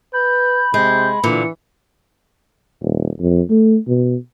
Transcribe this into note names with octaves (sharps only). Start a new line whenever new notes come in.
B4 B5 G6
C3 G#3 G6
A#2 D3 E3 C#7
D#1
F2
A3
B2